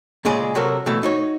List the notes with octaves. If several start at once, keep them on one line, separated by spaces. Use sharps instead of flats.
A#2 C#3 G#3 G#4 D5
C3 F#3 F#4 A4 A#4
B2 E3 A3
D#4 F#4 C#5